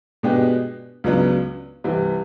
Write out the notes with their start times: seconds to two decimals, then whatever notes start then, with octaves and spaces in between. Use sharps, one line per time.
0.23 B2 G#3 B3 D4 G4
1.04 C#2 C#3 F#3 B3 D4
1.84 C2 C3 E3